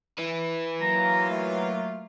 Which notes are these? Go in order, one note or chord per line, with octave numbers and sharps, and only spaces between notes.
E4 B4
F#3 A#3 F4 A#5
A3